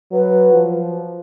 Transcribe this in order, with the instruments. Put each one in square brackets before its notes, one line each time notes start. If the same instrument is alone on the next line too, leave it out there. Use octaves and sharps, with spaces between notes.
[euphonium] F#3 [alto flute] B4
[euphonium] F3